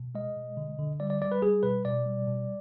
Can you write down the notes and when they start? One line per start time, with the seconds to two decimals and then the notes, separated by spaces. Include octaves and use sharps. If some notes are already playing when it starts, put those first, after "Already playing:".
Already playing: B2
0.15 G#3 D#5
0.37 B2
0.57 D3
0.79 D3
1.00 G3 D5
1.10 D5
1.22 G3 D5
1.32 B4
1.42 G3 G#4
1.63 B2 B4
1.85 B2 D5
2.06 G3
2.27 B2